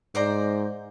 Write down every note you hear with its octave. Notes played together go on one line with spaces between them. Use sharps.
G#2 C5 D5 A#5